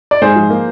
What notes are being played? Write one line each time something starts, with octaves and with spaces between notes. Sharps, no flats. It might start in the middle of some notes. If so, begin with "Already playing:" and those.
D5
G#2 G#4 C5
F3
A#3